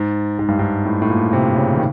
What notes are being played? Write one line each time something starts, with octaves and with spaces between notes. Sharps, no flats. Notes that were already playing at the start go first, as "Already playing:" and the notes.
Already playing: G#2
G#2
G2
G#2
A2
A2
A#2
C3
C#3
D#3